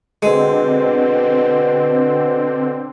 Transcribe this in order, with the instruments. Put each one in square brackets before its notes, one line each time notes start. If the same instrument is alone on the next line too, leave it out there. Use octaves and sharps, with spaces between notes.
[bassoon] B2 [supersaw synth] D3 C4 [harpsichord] G#3